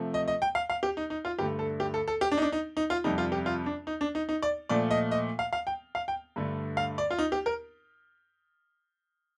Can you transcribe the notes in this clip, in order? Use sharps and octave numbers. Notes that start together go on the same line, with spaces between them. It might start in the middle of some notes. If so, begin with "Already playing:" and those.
Already playing: C3 F3 A3
D#5
D#5
G5
F5
F5
G4
D#4
D#4
F4
G2 D3 A3 G4
A4
G4
A4
A4
G4
D4
D#4
D4
D#4
D#4
F4
F2 C3 G3 D#4
F4
G4
F4
D4
D#4
D4
D#4
D#4
D5
A#2 F3 A3 D5
D#5
D#5
F5
F5
G5
F5
G5
G2 D3 A3
F5
D5
F4
D#4
G4
A#4